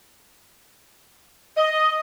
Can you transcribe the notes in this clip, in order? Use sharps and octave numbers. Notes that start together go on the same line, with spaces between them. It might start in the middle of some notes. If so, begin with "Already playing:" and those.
D#5